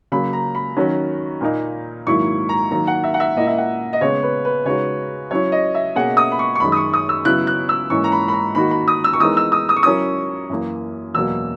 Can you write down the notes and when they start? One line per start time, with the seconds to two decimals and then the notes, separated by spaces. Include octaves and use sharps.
0.12 C#3 F#3 A#3 B5
0.33 A#5
0.55 B5
0.76 D#3 F#3 C#4 F#4 A#4
1.41 A#2 A#3 D#4
2.07 G#2 D#3 F#3 A#3 E4 C#6
2.49 A#5
2.71 D#3 F#3 A#3 A#5
2.87 F#5
3.04 E5
3.14 F#5
3.20 E5
3.36 A#2 A#3 E4 D#5
3.47 E5
3.58 F#5
3.93 D#5
4.01 C#3 G#3 B3 C#5
4.23 B4
4.45 B4
4.65 C#3 G#3 D#4 F#4 C#5
5.31 F#3 C#4 E4 C#5
5.52 D#5
5.75 E5
5.96 B2 A#3 C#4 G#4 F#5
6.17 D#6
6.32 B5
6.39 C#6
6.55 C#6
6.60 F#2 D#3 G#3 B5
6.72 D#6
6.76 C#6
6.94 D#6
7.09 E6
7.25 C#3 F#3 B3 E4 F#6
7.47 F#6
7.69 E6
7.90 G#2 E3 A#3 C#4 C#6
8.04 A#5
8.12 B5
8.28 B5
8.33 A#5
8.55 D#3 A#3 D#4 F#4 B5
8.71 B5
8.88 D#6
9.04 E6
9.13 C#6
9.20 E3 G#3 B3 D#4 A#4 D#6
9.37 E6
9.52 D#6
9.69 D#6
9.76 C#6
9.83 F#3 C#4 E4 A#4 D#6
10.49 F#2 E3 A#3
11.14 E2 B2 F#3 A#3 E6